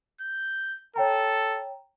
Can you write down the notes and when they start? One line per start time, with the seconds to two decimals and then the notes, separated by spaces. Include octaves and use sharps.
0.21 G6
0.96 A4 C#5 G5 A#5